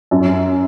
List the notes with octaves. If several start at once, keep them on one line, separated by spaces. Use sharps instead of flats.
F#2